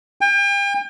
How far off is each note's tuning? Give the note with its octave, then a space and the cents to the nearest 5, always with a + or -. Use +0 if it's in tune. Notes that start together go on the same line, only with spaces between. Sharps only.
G5 +40